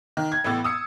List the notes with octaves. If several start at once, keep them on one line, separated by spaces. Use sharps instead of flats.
D#3
G#6
A1 A2 B3 E6 A6
D#6 E6 C#7